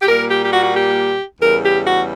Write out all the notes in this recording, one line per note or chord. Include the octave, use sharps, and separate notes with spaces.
G4
A#2 G3 A#3 A#4
G4
G4
F#4
F#4
G4
E2 C#3 G3 A#4
G4
F#4